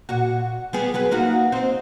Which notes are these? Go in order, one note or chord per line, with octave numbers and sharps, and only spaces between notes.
A#2 F#4
G3 B3 G#4
F#3 G#4 B4
A#3 D#4 F#4
C4 D#4 C5